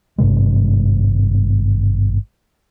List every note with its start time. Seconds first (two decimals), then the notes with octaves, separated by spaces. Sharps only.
0.18 G#1 G2 C3 G#3